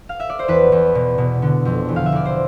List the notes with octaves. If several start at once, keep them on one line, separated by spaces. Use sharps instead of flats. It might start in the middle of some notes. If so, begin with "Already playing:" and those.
F5
E5
D5
C5
E2 B4
E2
B2
B2
D3
F2
E2
F5
E5
E2 D5
C5